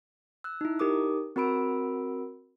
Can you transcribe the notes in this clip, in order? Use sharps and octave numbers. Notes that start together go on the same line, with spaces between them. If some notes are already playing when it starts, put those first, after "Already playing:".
E6 F#6
D#4 E4
D#4 G4 A#4 D6 D#6
C4 F#4 A#4 B5 E6 D7